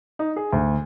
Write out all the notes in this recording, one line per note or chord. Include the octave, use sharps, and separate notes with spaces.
D#4
G#4
D2